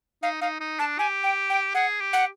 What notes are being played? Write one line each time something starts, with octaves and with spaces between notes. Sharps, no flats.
D#4 F5
D#4 F5
D#4
D4 A5
G4 G#5
G5
G5
G#4 F#5
G4
F#5